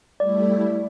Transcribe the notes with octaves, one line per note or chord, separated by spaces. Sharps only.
G3 A3 E4 D5